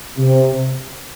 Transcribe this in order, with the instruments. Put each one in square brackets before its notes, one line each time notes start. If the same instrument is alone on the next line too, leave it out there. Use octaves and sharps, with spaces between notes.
[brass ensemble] C3